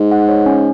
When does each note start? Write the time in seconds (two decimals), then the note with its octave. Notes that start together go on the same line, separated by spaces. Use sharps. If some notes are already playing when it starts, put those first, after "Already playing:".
Already playing: G#2
0.12 F#5
0.29 C#5
0.46 C#4